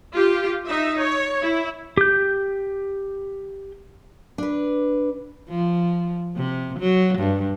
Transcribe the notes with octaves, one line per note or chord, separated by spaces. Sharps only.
F4 G4
D#4 E5
C#5
E4
G4 G6
D4 B4
F3
C3
F#3
G2